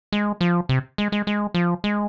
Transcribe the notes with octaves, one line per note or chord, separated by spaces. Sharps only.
G#3
F3
C3
G#3
G#3
G#3
F3
G#3